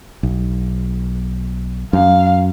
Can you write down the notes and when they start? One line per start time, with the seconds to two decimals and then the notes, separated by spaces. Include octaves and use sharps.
0.23 B1
1.93 F#2 F5